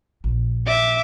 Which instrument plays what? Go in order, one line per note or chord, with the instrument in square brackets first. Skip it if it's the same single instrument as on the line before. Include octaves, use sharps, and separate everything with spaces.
[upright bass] A#1
[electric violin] E5 D6